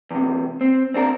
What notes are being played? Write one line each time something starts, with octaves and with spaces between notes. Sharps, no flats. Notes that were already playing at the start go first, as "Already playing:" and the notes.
E2 C3
C4
C4 D4 G#4 A#4